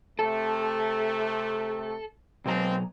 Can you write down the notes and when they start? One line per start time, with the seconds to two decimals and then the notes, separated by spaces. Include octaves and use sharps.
0.19 C3 A3 A4
2.45 B2 F#3 G#3 A#3 C4 A#5